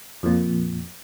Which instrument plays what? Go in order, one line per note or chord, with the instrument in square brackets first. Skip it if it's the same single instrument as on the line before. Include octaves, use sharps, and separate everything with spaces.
[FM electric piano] F2 A#2